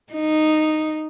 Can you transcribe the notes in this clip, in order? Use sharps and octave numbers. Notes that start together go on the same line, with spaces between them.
D#4